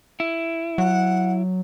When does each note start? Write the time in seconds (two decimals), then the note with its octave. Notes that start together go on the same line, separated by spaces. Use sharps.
0.20 E4
0.78 F#3 F#5